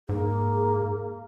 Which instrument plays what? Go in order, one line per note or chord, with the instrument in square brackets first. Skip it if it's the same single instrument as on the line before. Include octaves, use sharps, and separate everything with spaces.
[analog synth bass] G#2 [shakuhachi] A#3 [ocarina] G#4